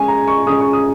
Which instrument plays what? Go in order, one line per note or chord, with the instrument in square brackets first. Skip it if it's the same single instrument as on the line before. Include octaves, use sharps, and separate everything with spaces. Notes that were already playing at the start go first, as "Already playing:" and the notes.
Already playing: [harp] G#3 C#4 G#4 [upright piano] G#5
[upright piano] A#5
C#6
[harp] G#3 C#4 G#4 [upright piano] D#6
[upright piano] C#6
D#6